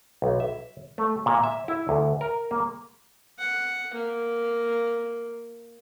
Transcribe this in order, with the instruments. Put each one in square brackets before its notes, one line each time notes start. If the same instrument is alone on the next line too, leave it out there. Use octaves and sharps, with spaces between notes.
[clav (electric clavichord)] B1
E5
A3
A#2
E5
E4
D2
A#4
A#3
[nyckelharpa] F#5
A#3